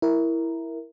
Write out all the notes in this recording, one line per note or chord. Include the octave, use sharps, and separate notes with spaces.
E4 A#4